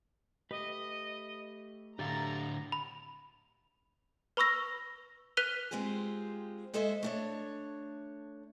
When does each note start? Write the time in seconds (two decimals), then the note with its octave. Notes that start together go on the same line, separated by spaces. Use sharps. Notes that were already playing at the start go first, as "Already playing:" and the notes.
0.51 A3 G4 B4 D#5
1.99 A2 D3 G4 A4 F5 A#5 A6
2.72 B5
4.37 B4 B5 C#6 E6 A#6
5.37 B4 F#6 B6 D#7 F7 G7
5.71 G#3 C4 F4 G4 G#4
6.74 G#3 G#4 A4 C5 D#5 E5
7.03 A3 D4 C#5